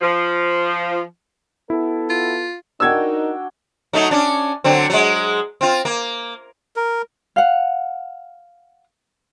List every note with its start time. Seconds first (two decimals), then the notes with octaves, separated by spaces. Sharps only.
0.02 F3
1.70 B3 E4 F#4 A4
2.10 F4
2.80 D4 D#4 F#4 A#4 G5 E6 G#6
3.93 F#3 A3 D#4
4.11 C#4 D4
4.64 D3 F#3 C4
4.90 F#3 G#3
5.61 C4 F4
5.85 A#3
6.76 A#4
7.36 F5 F#5